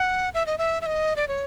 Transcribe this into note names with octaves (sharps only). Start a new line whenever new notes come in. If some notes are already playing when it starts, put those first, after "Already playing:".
Already playing: F#5
E5
D#5
E5
E5
D#5
D5
C#5